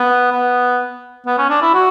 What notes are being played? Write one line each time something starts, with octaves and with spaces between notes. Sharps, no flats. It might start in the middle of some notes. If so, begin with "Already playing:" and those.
Already playing: B3
B3
B3
C#4
D4
E4
F#4